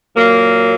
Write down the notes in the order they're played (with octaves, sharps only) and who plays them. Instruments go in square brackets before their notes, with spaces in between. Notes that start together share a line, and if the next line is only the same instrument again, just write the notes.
[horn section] A#2 F#3 A#3